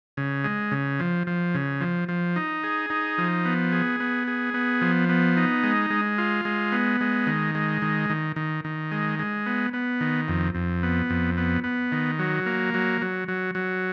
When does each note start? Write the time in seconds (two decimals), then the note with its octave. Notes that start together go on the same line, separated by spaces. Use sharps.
0.17 C#3
0.44 G#3
0.72 C#3
1.00 F3
1.27 F3
1.55 C#3
1.81 F3
2.09 F3
2.36 D#4
2.64 G#4
2.90 D#4
3.18 F3
3.45 B3
3.72 G#4
4.00 B3
4.27 G#4
4.54 B3
4.81 F3
5.09 B3
5.37 D#4
5.63 G#3
5.90 G#3
6.18 F4
6.45 G#3
6.72 B3
7.01 G#3
7.27 D#3
7.55 G#3
7.82 D#3
8.10 D#3
8.36 D#3
8.65 D#3
8.91 G#3
9.19 G#3
9.46 B3
9.73 B3
10.01 D#3
10.28 F2
10.55 F2
10.83 B3
11.10 F2
11.37 B3
11.64 B3
11.92 D#3
12.19 F#3
12.46 A#3
12.74 F#3
13.01 F#3
13.28 F#3
13.55 F#3